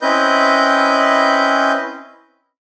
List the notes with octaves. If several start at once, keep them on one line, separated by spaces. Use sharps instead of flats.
C4 C#4 E4 B4 D#5 G6